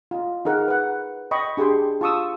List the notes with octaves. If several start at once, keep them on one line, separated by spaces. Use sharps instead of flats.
F4 D#5
D#4 G#4 A#4 F#5
B4 F#5
D#5 G5 B5 C#6
D4 G4 G#4 G5 C6
F4 A5 C#6 D#6 E6